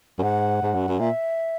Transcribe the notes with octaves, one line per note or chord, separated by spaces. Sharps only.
F#2
G#2 F#5
G#2
F#2
F#2
A#2 E5